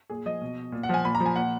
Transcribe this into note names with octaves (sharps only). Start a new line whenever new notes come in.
A#2 G#4
F3 D#5
B2
A#2
F#5
F3 G#5
A#2 B5
A#5
F3
G#5
A#2 F#5